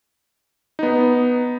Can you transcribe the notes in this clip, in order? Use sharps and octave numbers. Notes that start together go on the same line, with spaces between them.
B3 D#4